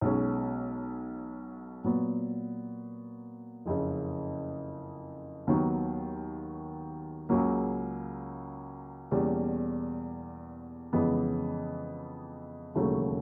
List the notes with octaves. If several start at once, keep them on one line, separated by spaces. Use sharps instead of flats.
B1 B2 G#3 C#4
A#2 F#3 B3
F#1 F2 C#3
D#2 D#3 F#3 B3
C#2 C#3 F#3 A#3
E2 B2 G3 A#3 C#4
F2 C#3 E3 G#3 B3
E1 D#2 C#3 F#3 A3